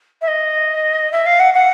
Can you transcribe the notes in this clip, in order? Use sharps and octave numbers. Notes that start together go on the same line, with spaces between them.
E5
D#5
E5
F5
F#5
F#5